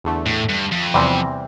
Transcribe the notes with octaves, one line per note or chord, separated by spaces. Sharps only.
E2 D3 A3
A2
G2
F2
E2 C3 E3 G3 C4